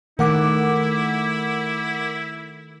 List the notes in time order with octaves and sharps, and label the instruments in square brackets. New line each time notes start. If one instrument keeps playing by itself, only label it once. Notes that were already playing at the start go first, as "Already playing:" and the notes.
[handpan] D#3 [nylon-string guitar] A3 [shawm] E4 [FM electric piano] A#4 F#5 D6